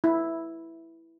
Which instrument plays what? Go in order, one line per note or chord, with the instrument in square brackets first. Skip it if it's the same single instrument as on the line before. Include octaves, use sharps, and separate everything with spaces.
[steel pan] E4